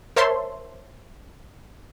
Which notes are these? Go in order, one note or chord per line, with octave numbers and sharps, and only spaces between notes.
A#4 C5 C#5 E5 A5 C6